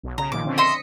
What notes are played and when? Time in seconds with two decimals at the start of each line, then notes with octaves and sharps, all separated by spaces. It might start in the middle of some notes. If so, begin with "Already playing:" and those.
0.03 B1
0.18 C#3 A#5
0.32 A#2 D#3 F3 D6
0.45 D3 C4 C#4
0.58 D#5 E5 C6 D#6 B6 C#7